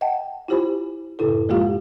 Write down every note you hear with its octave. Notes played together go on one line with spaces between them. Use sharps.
D#5 F#5 G5 A5
E4 F4 G4 C5 G#5 B5
F#2 A2 C#3 E4 A4
F3 G#3 A#3 F4 G4 F5